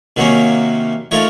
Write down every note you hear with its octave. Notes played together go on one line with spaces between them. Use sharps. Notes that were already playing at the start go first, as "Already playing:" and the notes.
C3 D#3 F#3 A#3 C#4
F3 A3 D#4 A#4 C#5